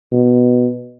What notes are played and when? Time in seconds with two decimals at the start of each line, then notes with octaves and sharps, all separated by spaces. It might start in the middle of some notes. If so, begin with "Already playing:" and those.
0.12 B2